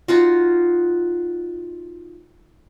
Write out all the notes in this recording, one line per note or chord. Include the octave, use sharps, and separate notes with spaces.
D#4 F4 F#4